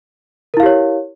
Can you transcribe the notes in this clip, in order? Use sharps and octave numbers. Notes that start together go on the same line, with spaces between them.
E4 G4 A#4 C#5 F5